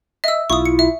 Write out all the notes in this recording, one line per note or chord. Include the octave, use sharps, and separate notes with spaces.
D#5 E5 E6
B1 E4 F4 C#6 D#6
C#7
E5